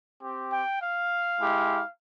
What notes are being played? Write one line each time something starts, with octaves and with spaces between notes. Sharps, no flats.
C4 G4
G5
F5
G#3 E4 G4